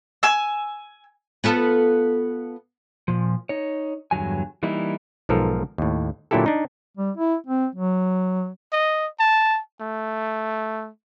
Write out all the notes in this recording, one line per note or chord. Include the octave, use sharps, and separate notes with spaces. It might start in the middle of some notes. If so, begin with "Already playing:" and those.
G#5 E6
B3 F4 A4
A#2 F3
D#4 C#5
E2 G2 D3 F#3 G#5
E3 G3 A#3 D#4 E4
B1 G#2 F3 A4 A#4
D#2 A2
A#2 D3 F#3 E4 G4 A4
D4 D#4
G3
E4
C4
F#3
D#5
A5
A3